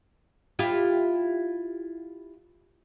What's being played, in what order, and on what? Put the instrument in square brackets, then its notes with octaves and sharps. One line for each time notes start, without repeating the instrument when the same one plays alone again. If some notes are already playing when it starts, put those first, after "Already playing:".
[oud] E4 F4 G4